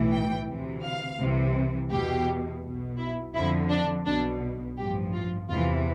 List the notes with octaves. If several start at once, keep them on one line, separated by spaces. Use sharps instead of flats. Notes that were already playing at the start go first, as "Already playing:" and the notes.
Already playing: B1 A2 E3
G5
D2 C3 E3
F5
C2 C3 E3
E2 B2 G4
B1 B2
E4
F2 D3 F3 E4
D4
B1 B2 D4
A1 G2 F3 G4
F4
E2 C3 E3 F4